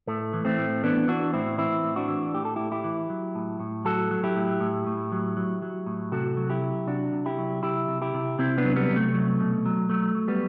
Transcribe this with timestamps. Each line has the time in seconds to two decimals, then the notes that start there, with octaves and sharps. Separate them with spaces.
0.07 A2 A3
0.33 E3
0.45 A3 C4
0.59 A2
0.84 E3 B3 D4
1.08 E3 D4 F#4
1.33 A2 C4 E4
1.58 E3 C4 E4
1.84 A2
1.96 D4 F#4
2.09 E3
2.34 A2 G4
2.45 A4
2.56 A2 E4 G4
2.72 E4 G4
2.84 E3
3.10 F#3
3.35 A2
3.60 A2
3.85 F#3 F#4 A4
4.11 F#3
4.24 E4 G4
4.36 A2
4.60 A2
4.87 A2
5.12 F#3
5.37 F#3
5.62 F#3
5.86 A2
6.12 C3 F#4 A4
6.37 F#3
6.50 E4 G4
6.62 F#3
6.87 C3 D4 F#4
7.12 C3
7.26 E4 G4
7.38 F#3
7.63 C3 E4 G4
7.88 C3
8.02 E4 G4
8.14 C3
8.39 C3 C4 E4
8.58 B3 D4
8.65 F#3
8.76 G3 B3
8.89 C3
8.96 A3
9.14 F#3
9.40 B2
9.66 F#3
9.90 F#3 A3
10.15 F#3
10.28 G3 B3